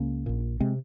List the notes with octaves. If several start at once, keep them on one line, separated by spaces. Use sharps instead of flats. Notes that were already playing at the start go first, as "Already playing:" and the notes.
Already playing: C#2 C#3 A#3 C#4
A#1 A#2
C3 G#3 C4